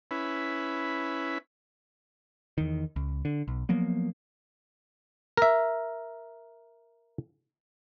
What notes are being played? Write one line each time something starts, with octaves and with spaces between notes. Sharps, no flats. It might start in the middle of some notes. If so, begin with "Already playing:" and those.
C#4 E4 B4
E2 D#3
C#2
D3
B1
F3 F#3 A#3 B3
A#4 E5